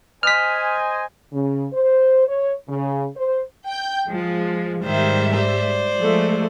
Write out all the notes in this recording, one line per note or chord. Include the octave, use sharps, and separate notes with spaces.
C5 D#5 G#5 F6 B6
C#3
C5
C#5
C#3
C5
G5 G6
F3 G#3
G#2 D#3 G3 C5 E5
C5 D5
F3 G#3 A3